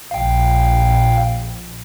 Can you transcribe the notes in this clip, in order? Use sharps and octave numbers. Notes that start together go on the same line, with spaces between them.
A#1 F5 G5